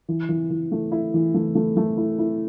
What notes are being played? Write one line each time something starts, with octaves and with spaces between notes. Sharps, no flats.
E3
E3
E3
A3
E4
E3
A3
A3
A3
E4
E4